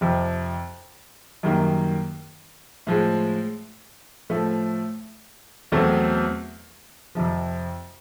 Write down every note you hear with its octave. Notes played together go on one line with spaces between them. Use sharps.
F2 C3 F3
F#2 D#3 G3 A#3
A2 F3 G#3
A2 F3 A3
E2 B2 F#3 A3 C4
F2 C3 F3